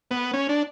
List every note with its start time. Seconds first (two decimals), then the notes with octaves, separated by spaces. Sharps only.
0.11 B3
0.34 C#4
0.49 D4